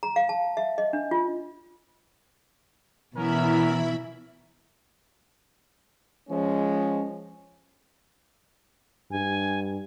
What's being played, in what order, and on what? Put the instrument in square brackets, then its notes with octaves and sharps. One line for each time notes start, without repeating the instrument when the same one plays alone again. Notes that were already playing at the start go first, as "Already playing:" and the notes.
[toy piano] A#5
F5
A5
E5
D#5
D4
F4
[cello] B2 E3 [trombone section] B3 C#4 A#4 [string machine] E4 E5 B5
[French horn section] F3 G#3 C#4
[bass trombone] G2 [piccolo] G#5